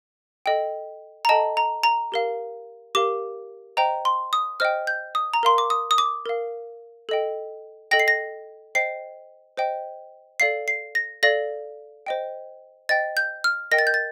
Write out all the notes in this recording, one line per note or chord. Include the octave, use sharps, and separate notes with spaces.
A4 D#5 G5
A#5
A4 D#5 G5 A5
A#5
A#5
G4 A#4 F5
G4 A#4 F5 D6
C5 D#5 G5 A#5
C6
D#6
C5 D#5 G5 F6
G6
D#6
A#5
A#4 F5 C6
D6
D#6
D#6
D6
A#4 F5
A4 D#5 G5
A4 D#5 G5 A#6
C7
A#6
C5 D#5 G5 C7
C5 D#5 G5
A4 D5 F5 C7
C7
A#6
A4 D5 F5 A#6
C5 D#5 G5
C5 D#5 G5 A6
G6
F6
A#4 D#5 G5 A#6
A6
G6
A6